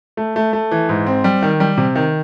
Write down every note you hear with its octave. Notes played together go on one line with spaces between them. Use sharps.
A3
A3
A3
E3
G#2
C4
G3
D#3
G3
C3
D#3